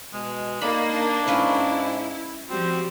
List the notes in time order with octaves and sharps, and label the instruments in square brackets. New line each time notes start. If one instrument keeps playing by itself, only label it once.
[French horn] B2 [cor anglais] G#3
[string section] A#3 [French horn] D#4 [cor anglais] D5 [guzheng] B5
[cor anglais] D4
[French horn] G#2 [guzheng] A#3 C#4 B4 [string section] E4
[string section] F3 G3 [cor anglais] C4 [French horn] F#4